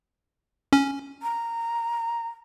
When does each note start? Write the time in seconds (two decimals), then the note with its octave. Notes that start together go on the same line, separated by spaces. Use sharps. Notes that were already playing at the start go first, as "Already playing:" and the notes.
0.73 C#4
1.22 A#5